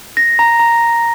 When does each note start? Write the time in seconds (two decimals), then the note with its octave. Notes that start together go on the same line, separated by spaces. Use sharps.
0.17 A#6
0.39 A#5
0.59 A#5